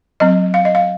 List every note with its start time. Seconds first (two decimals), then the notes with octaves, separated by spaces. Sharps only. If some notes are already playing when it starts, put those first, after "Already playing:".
0.20 F#3 C4 D#5
0.54 F5
0.65 D#5
0.75 F5